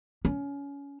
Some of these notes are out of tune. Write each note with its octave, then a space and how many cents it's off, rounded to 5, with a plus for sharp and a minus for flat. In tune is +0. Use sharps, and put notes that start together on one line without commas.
C#4 +25